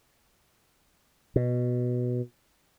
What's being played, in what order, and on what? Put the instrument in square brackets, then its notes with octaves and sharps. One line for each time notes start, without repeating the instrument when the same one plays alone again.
[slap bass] B2